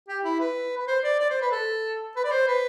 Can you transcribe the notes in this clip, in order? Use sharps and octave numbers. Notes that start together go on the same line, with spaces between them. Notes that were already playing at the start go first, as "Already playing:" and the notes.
G4
E4
B4
B4
C5
D5
D5
C5
B4
A4
B4
D5
C5
B4